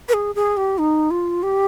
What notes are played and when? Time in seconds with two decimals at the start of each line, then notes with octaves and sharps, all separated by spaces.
0.09 B4
0.13 G#4
0.35 G#4
0.57 G4
0.78 D#4
1.11 F4
1.43 G4